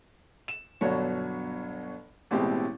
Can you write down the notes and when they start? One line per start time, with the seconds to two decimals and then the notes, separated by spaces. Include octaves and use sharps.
0.48 E7
0.81 G1 B2 F#3 D4 C#5
2.31 A1 B2 G#3 C4 E4 G4